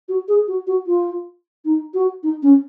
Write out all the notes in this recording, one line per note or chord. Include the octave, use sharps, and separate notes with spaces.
F#4
G#4
F#4
F#4
F4
D#4
F#4
D#4
C#4